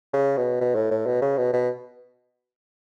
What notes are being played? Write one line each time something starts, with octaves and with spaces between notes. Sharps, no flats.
C#3
B2
B2
A2
A2
B2
C#3
B2
B2